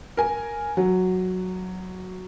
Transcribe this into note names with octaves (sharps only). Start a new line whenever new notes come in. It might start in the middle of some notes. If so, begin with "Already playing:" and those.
A#4 G#5
F#3